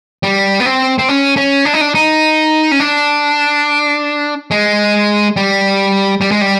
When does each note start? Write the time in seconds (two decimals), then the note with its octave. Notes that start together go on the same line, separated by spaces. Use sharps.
0.23 G3
0.60 B3
0.66 C4
0.98 C4
1.09 C#4
1.37 C#4
1.65 D4
1.73 D#4
1.81 D4
1.95 D#4
2.71 C#4
2.80 D4
4.51 G#3
5.36 G3
6.21 G3
6.31 G#3
6.41 G3